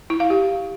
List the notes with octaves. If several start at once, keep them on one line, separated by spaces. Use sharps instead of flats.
E4
F5
G4